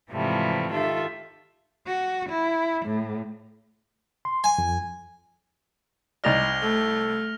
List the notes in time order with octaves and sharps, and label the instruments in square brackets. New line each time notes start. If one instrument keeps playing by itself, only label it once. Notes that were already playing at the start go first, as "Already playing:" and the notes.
[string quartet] G#2 C3 E3 F3 G3 A3
D#3 F4 G4 A4 E5
[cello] F#4
E4
A2
[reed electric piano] C6
[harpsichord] G#5
[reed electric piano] F2
[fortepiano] C2 D#4 D5 [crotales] F6 A#6 F7
[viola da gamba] A3 [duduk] A4